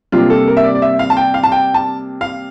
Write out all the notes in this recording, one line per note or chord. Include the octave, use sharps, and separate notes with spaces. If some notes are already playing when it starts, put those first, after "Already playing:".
C3 G3 A#3 D4 F4
A4
A#4
E5
D5
D5
E5
F5
A5
G5
F5
A5
G5
A5
F5